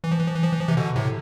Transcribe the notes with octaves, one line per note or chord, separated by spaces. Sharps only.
E3
F3
E3
F3
E3
F3
E3
F3
C3 E3
B2 D3
A2 C3